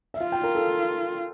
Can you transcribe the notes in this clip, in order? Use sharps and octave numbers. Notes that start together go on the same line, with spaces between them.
E5
F4 F5
G5
A#4
A4